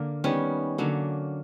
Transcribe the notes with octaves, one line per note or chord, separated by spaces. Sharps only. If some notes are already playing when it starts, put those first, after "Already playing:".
Already playing: D3 A#3
D#3 G3 B3 C#4
D3 F#3 A#3